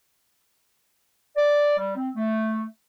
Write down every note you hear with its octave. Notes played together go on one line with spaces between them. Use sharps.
D5
G3
C4
A3